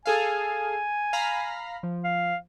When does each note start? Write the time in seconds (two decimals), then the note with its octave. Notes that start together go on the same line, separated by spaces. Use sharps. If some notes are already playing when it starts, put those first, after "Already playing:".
0.06 G#4 A4 F5 G#5
1.13 F5 A#5 B5
1.83 F3
2.04 F5